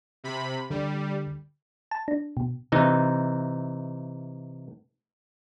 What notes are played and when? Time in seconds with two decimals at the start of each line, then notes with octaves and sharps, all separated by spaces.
0.24 C3 B5
0.70 D3 G3
1.91 A5
2.08 D4
2.37 B2
2.72 C3 E3 D#4